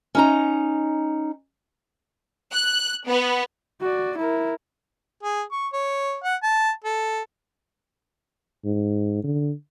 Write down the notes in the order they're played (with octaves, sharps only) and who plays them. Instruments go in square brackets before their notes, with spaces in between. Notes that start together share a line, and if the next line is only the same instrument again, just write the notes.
[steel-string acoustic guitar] C#4 D#4 A#5
[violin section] F#6
B3
[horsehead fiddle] F#4 D5
E4 A#4
[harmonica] G#4
C#6
C#5
F#5
A5
A4
[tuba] G#2
D3